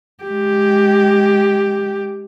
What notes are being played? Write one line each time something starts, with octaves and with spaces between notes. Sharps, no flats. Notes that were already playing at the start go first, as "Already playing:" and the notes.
G#3 G4